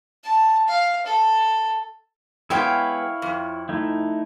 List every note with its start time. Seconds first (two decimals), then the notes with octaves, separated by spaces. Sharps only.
0.24 A5
0.68 F5
1.06 A4
2.50 G#3 B3 E4 C#5 F5 G5
3.22 F2
3.69 A3 D#4 E4